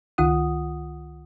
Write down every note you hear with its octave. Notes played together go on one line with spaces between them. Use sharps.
C#2 D#3 F4 F#5 D#6